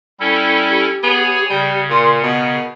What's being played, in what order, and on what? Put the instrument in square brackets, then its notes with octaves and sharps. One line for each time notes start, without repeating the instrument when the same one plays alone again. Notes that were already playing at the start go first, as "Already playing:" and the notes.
[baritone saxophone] G3 [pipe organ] C#4 E4 A4
[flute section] G4
[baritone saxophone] B3 [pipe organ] G#4 C#5 G#5
[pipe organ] C#3 [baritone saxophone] G3
[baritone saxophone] A#2 [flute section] A#4 C6
[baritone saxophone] B2 [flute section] A#4